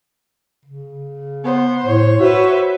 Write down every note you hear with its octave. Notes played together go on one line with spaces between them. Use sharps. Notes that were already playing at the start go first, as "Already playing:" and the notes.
C#3
B3 C5
A2 C#5
F#4 B4 C5 E5